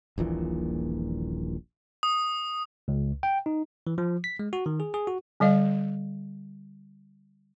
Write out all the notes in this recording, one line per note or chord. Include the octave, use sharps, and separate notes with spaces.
D#1 A#1 A#2 E3
D#6
C#2
G5
D#4
E3
F3
B6
G#3
F#4
D#3
G#4
G#4
F#4
D3 G3 D#5 F5